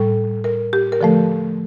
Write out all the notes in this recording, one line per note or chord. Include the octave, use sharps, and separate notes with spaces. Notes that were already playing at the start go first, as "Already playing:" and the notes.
Already playing: A2 G3 A4
A#4
G4
A#4
D3 F3 A3 A4